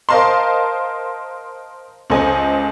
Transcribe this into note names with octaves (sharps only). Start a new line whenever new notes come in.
A#4 C5 D#5 F5 A5 C6
C#2 A4 C5 D#5 G#5